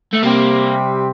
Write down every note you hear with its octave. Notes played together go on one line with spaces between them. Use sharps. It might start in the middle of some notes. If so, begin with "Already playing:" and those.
A3
C3 G3 A#3 C4 G4